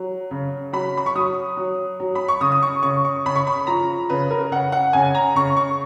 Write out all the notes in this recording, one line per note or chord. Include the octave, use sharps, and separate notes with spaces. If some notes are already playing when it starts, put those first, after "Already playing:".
Already playing: F#3
C#3
F#3 B5
B5
C#6
F#3 D#6
F#3
F#3
B5
C#6
C#3 D#6
D#6
C#6
C#3 C#6
C#6
C#3 B5
C#6
B5
F3 A#5
C#3 B4
A#4
C#3 F#5
F#5
C#3 G#5
A#5
C#3 C#6
C#6